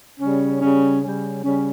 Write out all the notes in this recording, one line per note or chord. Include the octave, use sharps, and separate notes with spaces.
C#3 G3 C#4
C#3 G3 C#4
C#3 G3 C#4
C#3 G3 C#4